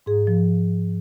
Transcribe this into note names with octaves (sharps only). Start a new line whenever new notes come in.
G#2 G#4
F3